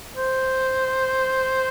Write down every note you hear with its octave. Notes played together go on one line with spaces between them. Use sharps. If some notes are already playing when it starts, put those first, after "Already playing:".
C5